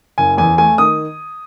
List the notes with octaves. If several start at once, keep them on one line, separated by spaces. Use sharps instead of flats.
F#1 G#5
E2 G#5
A3 G#5
D#3 D#6